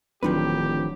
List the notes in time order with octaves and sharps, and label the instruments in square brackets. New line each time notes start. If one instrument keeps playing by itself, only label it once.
[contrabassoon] D1 [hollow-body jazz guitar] D#3 F3 B4 [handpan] F#3 D4 [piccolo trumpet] G4